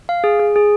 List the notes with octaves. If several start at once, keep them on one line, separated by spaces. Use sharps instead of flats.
F5
G#4
G#4
G#4